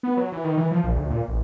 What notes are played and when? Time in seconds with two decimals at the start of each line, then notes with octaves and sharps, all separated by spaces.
0.03 B3
0.17 F#3
0.32 E3
0.44 D#3
0.57 E3
0.71 F3
0.84 A#1
0.96 D2
1.10 A#2
1.28 A1